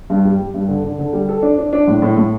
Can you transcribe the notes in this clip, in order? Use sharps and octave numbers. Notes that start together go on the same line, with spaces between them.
G2
G3
G3
G2
D3
D3
D3
G3
A4
D4
D4
D4
A2
A2
A2